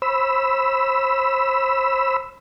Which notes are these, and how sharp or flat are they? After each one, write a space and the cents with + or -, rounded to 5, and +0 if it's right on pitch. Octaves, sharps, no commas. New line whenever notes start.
C5 +35 B5 +0 E6 +0